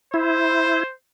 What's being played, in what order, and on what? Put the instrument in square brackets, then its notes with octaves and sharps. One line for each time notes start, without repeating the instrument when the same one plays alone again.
[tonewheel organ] E4 [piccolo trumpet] C5